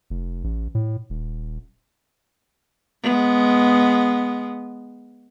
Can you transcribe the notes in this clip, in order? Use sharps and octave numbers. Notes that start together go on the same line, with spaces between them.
F1
A1
A2
D#1
G#3 B3